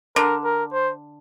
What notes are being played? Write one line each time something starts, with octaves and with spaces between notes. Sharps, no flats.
D3 A#4
A#4
C5